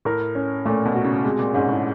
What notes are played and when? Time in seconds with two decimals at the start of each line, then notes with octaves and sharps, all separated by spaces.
0.05 A2 A#4
0.35 C#4
0.65 A#2 A3
0.85 B2
0.95 F#4
1.04 C#3
1.24 C3 G#3
1.39 A#2
1.54 G#2 C#4
1.69 A2